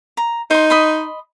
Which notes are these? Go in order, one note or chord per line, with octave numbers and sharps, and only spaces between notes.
A#5
D#4 C5 C6
D#5 B5 C6